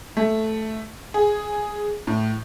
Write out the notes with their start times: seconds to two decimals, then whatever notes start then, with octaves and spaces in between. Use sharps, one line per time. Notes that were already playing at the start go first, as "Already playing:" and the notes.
0.17 A3
1.14 G#4
2.07 A2